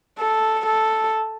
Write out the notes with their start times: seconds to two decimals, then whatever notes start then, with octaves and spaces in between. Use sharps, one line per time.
0.19 A4
0.66 A4